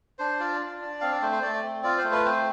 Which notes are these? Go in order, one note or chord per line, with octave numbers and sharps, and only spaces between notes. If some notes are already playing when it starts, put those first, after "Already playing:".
D4 C5
F4 D5
D4
D4
C4 F5
D5
A3 C5
C5
A3 D5
C4
F4 D5
C5
A3
B4
C4 C5